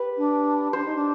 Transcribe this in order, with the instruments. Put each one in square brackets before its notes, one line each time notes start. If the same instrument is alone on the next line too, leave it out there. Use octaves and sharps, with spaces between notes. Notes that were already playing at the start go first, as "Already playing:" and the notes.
Already playing: [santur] G4 B4
[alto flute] D4
[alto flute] D4 [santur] C5
[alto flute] D#4
D4